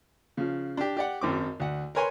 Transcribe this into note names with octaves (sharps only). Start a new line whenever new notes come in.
C#3 F3
D4 G4
G4 D5 F#5
G#1 F#2 C4 D6
D2 F#5
A#4 B4 C#5 G#5 A#5 C6